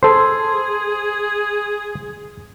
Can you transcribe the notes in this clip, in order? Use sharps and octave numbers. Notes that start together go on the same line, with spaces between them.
G#4 A4 C5 C6